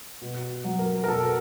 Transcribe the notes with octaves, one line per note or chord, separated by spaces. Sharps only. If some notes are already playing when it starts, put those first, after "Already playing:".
B2
F#3
A#4
A#4
B2 A4